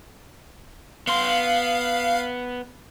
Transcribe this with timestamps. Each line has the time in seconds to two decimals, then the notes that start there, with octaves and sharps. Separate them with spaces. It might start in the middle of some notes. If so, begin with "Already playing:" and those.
1.07 B3 F5 C6